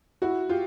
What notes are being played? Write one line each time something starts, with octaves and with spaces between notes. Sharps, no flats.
E4 F#4
F4 G4